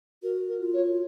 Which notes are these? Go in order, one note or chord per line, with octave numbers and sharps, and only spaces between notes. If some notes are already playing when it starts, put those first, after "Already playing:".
F#4 A#4
A#4
F4
C#5